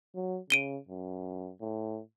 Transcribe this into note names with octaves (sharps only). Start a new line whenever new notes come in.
F#3
C#3 D7 D#7 G7
F#2
A2